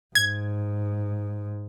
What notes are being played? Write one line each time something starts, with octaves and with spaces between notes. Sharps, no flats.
G#2 G#6